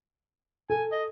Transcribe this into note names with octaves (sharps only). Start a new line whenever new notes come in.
A4 G#5
D#5